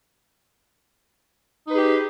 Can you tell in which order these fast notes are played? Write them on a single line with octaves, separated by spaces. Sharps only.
D#4 B4 G#4 G4